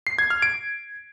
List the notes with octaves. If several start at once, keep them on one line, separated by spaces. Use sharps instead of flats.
C7
G#6
F6
D7